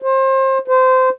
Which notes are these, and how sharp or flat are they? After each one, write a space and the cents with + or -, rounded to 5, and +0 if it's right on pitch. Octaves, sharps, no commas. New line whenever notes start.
C5 +30
C5 -20